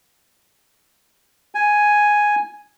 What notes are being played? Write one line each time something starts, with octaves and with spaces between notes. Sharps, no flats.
G#5